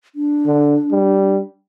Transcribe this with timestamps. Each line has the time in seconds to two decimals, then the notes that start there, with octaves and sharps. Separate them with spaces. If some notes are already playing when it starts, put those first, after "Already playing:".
0.15 D4
0.47 D3
0.91 G3